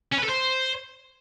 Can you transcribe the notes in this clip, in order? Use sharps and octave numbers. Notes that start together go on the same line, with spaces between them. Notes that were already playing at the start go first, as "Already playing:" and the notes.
C#4
B4
A4
C5